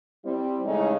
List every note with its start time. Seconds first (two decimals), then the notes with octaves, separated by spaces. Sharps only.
0.24 G3 C4 E4
0.64 C#3 E3 G#3 A3 C#4 D#4